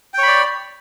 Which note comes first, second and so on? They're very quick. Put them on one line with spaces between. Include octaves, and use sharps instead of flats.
G5 C#5 B5 D5